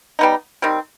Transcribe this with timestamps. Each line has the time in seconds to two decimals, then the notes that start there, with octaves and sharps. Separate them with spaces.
0.19 G3 B3 D#4
0.62 D#3 G3 C4